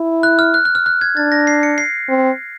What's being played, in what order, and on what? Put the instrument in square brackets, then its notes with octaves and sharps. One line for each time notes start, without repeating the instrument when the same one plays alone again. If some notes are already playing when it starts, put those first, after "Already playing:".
Already playing: [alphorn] E4
[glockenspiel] F#6
F6
F#6
F#6
F6
F#6
G#6
[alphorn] D4 [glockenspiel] A6
[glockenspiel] A#6
C7
C#7
C7
[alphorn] C4